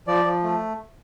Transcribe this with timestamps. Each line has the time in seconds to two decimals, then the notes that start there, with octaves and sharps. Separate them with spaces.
0.07 F3 D5
0.25 F3
0.43 A3